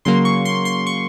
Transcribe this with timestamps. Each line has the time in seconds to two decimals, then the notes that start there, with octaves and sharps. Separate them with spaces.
0.05 C#3 F#3 A#3 C6
0.25 C#6
0.45 C6
0.65 C6
0.87 C#6